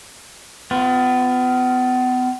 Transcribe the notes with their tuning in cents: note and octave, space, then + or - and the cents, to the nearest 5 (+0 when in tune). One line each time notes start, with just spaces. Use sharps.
B3 +35 F4 +0